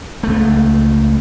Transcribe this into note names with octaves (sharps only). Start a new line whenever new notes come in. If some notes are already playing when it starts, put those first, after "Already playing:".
C#2 A3